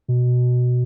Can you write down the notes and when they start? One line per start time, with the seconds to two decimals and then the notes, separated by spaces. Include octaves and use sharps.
0.08 B2